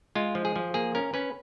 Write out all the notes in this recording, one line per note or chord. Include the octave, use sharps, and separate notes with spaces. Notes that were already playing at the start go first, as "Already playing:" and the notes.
G#3 F4
F3
G#4
F3
A#3 G#4
C#4 A#4
C#4 B4